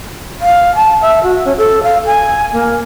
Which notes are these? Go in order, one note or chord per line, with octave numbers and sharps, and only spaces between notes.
F5
A5
E5
F#4
C#4
A4
F5
G#5
A#3